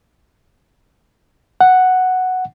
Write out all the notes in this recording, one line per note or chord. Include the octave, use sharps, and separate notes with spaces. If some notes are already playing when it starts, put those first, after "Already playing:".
F#5